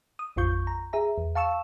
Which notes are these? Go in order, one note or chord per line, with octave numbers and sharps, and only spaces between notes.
D#6
A1 F2 F4 C#6 G6
A#5
G#4 E5 A#5
E2
F5 A5 C#6 E6 E7